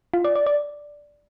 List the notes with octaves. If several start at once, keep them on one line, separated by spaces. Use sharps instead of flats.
F4
D5
D5
D5